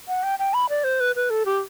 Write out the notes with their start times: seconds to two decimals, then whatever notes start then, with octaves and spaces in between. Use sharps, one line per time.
0.08 F#5
0.23 G5
0.39 G5
0.54 B5
0.69 D5
0.84 C5
1.00 B4
1.16 B4
1.30 A4
1.46 G4